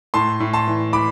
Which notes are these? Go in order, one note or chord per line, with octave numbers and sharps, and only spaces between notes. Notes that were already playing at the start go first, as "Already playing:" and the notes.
A2 A5 C6
A2
A5 C6
E3
E3 B5 D6